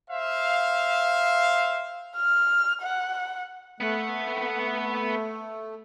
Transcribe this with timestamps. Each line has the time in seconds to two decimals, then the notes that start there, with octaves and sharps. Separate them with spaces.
0.10 C5 E5 F5
2.16 F6
2.82 F#5
3.80 A3 B3 F#5